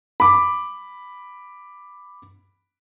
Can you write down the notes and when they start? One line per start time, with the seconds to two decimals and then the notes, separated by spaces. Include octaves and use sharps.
0.20 B5 D6